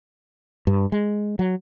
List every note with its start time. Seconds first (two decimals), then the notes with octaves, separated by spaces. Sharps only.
0.67 G2
0.92 G#3
1.39 F#3